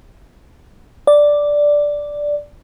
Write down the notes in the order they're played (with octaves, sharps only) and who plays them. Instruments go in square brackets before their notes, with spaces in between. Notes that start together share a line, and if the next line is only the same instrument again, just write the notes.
[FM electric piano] D5